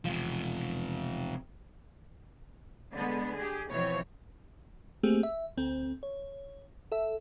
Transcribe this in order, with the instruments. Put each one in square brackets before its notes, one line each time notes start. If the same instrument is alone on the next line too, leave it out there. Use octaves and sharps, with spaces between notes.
[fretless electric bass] E1 [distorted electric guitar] C3 F3
[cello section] D3 G#3 B3
G4 G#4
B2 E3 F3 C4 C#5
[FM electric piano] A3 A#3 C4 G4 G#4
E5
D2 C4
C#5
A4 E5